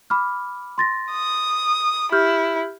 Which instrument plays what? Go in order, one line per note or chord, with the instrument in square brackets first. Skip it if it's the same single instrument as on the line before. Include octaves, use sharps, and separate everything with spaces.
[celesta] B5 D6 F6
C6 A6 A#6
[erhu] D#6
[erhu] E4 [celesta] G4 F6 G6